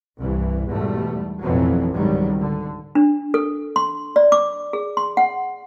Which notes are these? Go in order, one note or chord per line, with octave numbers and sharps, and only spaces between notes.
C2 G2 E3
E2 G#2 B2 G3 A3
A1 F2 B2 E3 F#3
C#2 G#2 C3 D#3 F#3 G3
D3
D4
A4
C6
D5
D6
G#4
C6
F#5